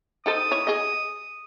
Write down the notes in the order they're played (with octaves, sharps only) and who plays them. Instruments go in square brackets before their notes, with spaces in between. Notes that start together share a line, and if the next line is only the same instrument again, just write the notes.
[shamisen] D#4 A4 C5 [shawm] D#6
[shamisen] E4 C#5
G#4 D#5